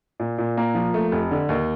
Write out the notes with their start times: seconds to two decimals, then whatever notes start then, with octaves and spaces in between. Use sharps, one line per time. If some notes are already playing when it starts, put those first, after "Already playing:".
0.20 A#2
0.38 A#2
0.58 A#3
0.75 F3
0.94 A3
1.12 F1
1.31 D3
1.49 D#2